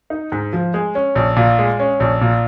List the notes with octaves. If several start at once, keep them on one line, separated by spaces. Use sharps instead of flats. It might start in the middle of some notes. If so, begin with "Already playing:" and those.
D#4
G#2
F3
G#3
C#4
A#1
A#2
G#3
C#4
A#1
A#2